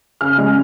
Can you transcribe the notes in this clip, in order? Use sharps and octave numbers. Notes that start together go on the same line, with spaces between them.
C#3 F6
G#3 C#4